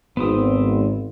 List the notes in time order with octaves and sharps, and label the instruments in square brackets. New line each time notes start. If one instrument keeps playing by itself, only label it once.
[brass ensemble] G#1 [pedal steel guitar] B3 C4 D#6